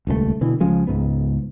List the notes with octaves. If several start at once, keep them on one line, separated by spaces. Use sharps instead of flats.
D#1 C#2 D#3 A3
B2 D3 E3
C#2 C#3 F3 G#3
C#2 G#2 B3